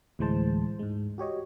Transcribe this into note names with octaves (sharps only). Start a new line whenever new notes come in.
D2 A2 E3 G#3 C5 A5
G#2 G#3
F#4 G4 C#5 D#5